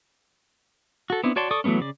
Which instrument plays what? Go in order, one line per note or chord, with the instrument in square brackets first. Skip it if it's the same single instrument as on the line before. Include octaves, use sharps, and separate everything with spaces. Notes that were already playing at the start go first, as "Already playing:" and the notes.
[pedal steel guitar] F#4 A4
B3 C4 D4 E4
F#4 C#5 D5 A5 C6
A4 D5 C#6 D#6
E3 F#3 A3 B3 C#4
C#3 D5